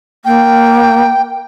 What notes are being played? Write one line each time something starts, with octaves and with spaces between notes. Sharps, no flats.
A#3 G5